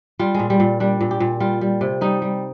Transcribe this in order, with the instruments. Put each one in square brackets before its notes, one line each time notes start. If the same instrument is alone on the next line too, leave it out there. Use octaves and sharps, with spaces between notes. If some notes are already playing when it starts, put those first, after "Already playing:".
[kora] G3 F4
A#2 G#3
G3
A#2
G3 D4
A#2
G4
A#2
G3 F4
G3
C3
G3 D#4
G3